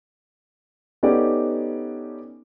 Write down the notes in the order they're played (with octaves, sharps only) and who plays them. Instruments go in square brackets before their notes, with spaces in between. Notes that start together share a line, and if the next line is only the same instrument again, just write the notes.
[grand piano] B3 C#4 D#4 G4 A4 D5